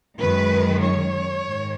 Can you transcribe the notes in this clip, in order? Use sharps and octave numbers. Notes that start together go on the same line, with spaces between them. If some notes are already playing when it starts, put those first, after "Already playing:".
F#2 D#3 G#3 B4
C#5
G#2 D#3